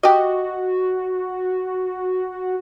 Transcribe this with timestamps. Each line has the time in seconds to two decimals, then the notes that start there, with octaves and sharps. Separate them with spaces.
0.03 F#4 G4 D#5